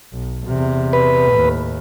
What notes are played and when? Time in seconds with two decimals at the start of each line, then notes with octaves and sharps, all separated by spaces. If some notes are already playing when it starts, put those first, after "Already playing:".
0.12 B1
0.45 E2 C3
0.93 B4
1.31 D#2 A2